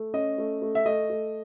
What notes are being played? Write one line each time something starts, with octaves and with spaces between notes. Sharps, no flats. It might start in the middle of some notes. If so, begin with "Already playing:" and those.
Already playing: A3
C#4 D#5
A3
A3
E5
A3 D#5
A3